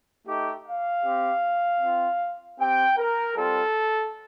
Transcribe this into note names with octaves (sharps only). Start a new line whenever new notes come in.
A3 D#4 G4
F5
C4 G4
C4 F4
C4 G4 G5
A#4
G3 C4 F4 A4